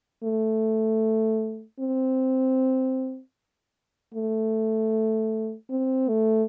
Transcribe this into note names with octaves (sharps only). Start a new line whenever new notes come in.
A3
C4
A3
C4
A3